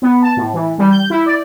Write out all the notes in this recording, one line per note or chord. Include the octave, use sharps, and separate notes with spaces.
B3
A5
A2
E3
G3
G6
E4
D5